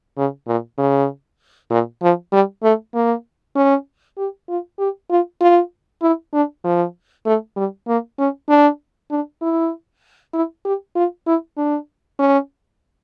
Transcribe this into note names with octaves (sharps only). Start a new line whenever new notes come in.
C#3
A#2
C#3
A#2
F3
G3
A3
A#3
C#4
G4
F4
G4
F4
F4
E4
D4
F3
A3
G3
A#3
C#4
D4
D4
E4
E4
G4
F4
E4
D4
C#4